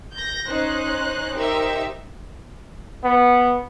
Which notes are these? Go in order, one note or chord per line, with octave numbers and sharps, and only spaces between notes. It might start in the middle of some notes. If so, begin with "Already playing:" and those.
G6 A#6
C#4 D#4 C5 F#6
D#4 G4 A#4 C5 E5
B3